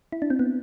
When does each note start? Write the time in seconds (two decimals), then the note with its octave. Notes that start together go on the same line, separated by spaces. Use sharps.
0.12 E4
0.22 D4
0.30 C4
0.39 B3